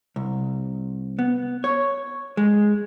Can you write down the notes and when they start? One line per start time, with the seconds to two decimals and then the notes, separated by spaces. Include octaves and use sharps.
0.16 C2
1.19 B3
1.64 C#5
2.37 G#3